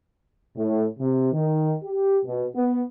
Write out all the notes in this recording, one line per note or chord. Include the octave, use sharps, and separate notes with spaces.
A2
C3
D#3
G4
B2
B3